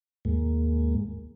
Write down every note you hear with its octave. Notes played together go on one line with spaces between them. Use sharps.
D#2 G#2 G#3 A#3